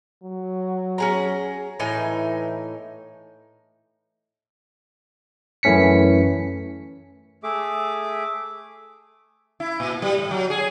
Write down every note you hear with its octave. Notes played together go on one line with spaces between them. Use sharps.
F#3
C#4 G#4 A#5
A2 E3 D#4 G#5
F#2 E3 A3 C#4 B6 C#7
A3 G#4 E5 D6
E4
A#2
G3
A2
F#3
G#4